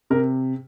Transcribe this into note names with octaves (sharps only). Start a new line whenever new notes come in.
C3 A#4